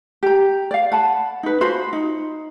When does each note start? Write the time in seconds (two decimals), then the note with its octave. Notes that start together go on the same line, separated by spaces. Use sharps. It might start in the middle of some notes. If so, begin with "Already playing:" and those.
0.23 G4 A#5
0.71 D5 F5
0.92 F#5 A5 B5
1.43 D#4 B4
1.61 F4 F#4 C5 B5
1.93 D#4